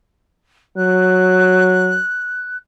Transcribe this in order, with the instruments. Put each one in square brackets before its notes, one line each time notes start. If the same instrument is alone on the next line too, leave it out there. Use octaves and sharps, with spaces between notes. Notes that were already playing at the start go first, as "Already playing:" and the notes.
[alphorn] F#3 [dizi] F#6